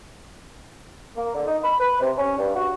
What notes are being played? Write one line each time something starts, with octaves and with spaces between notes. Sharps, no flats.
A#3
D3
D#4
B5
B4
C3
C#4
G2
F#4